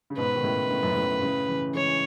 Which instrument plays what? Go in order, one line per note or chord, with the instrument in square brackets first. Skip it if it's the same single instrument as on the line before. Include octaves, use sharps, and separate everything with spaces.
[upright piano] C#3
[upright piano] G#2 B2 [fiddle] B4
[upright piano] D#3
A2 C#3
A2 C#3
F#2 A2
F#2 A2
F#2
A2 C#3
C#3 E3
[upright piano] E3 G#3 [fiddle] C#5